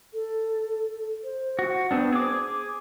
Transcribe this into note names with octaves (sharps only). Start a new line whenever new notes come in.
A4
C5
F#4
B3 C4 D4
G#4 D6